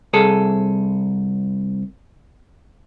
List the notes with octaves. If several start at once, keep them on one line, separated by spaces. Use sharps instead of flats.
C2 G#4 A4